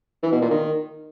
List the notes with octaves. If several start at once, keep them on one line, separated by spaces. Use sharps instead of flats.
E3
B2
A#2
D#3